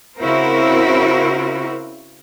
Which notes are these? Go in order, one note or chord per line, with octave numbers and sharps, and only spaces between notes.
C#3 C4 E4 F#4 A#4 C5